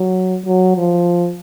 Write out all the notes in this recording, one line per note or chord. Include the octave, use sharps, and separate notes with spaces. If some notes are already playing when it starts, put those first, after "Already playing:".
Already playing: F#3
F#3
F3